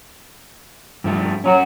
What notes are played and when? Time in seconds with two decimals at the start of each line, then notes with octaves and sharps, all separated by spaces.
1.04 G2 F3 A3
1.44 F#3 C#4 F4 F#4